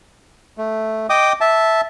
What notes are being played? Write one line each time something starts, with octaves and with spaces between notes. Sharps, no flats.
A3
D#5 G5 D6 D#6
E5 A5